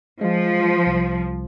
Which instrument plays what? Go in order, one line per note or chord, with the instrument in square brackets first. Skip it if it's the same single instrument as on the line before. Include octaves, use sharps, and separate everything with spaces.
[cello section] F3 [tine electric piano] G#3 F4
[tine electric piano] C2